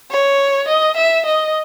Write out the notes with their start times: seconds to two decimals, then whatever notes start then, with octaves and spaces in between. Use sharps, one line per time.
0.11 C#5
0.68 D#5
0.97 E5
1.26 D#5